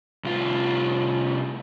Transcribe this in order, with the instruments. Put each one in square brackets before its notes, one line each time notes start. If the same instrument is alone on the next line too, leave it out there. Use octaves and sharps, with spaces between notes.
[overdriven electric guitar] C2 F4